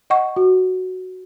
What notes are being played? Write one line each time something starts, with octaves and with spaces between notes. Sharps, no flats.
D#5 F#5 C#6
F#4